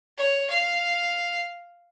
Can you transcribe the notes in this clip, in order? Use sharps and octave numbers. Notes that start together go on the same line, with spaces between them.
C#5
F5